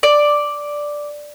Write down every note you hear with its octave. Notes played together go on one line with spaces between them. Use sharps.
D5